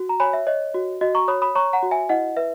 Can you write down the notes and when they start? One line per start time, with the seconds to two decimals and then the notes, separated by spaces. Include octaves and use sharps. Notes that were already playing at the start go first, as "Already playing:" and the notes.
Already playing: F#4
0.09 A#5
0.20 C#5 G#5 B5
0.33 E5
0.47 C#5 D#5
0.74 F#4
1.01 F#4 D#5
1.15 A#5 C#6
1.28 C#5 B5 D#6
1.42 B5 D#6
1.55 C#5 A#5 C#6
1.73 F#5 A#5
1.83 F#4
1.91 E5 G#5
2.09 E4 D#5 F#5
2.37 B4 E5